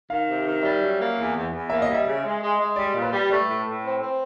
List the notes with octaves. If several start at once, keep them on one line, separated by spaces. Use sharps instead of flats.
D#3 F5
C3
D#3
G3 E5
F#2
A#3
E2
E2
E2
A#3 E5
G3 D#5
E5
C#3
G#3
G#3
G#3
G3 D5
A#2
B4
G3
A3 B4
A2
A2
C4
C4